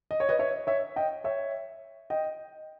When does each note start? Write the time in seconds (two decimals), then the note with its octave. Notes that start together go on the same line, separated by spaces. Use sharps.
0.11 D#5
0.20 C#5
0.29 B4 D#5
0.39 C#5 E5
0.67 C#5 E5
0.96 D#5 G5
1.24 C#5 E5
2.10 D#5 G5